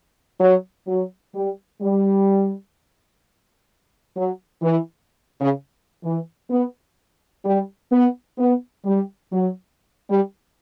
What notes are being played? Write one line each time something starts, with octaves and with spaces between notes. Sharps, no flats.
F#3
F#3
G3
G3
F#3
E3
C#3
E3
B3
G3
B3
B3
G3
F#3
G3